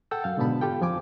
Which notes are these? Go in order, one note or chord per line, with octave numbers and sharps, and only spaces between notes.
A4 F#5 G5 E6 G6 A6
F#2 F5
G#2 B2 D3 B3 A5 B5
F4 G4 A4 G5
F2 F3 G#5 D6